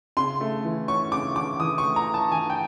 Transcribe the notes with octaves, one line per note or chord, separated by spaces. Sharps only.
C#3 C6
A3
E3
C#4 C#6
C#3 D6
E3 D6
E3 D#6
C#6
A3
A#5
A3
A5
E3 G#5
G5